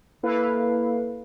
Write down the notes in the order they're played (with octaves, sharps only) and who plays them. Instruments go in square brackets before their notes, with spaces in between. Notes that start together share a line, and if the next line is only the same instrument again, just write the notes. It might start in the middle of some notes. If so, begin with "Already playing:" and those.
[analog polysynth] A#3 E4 A4 B4 F5